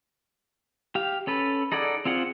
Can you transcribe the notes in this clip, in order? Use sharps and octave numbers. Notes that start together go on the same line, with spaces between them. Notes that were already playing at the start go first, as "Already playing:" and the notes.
G4 F5
C#4 A4 B4
D#4 G#4 A4 D5 F#5
C4 F4 G#4 F#5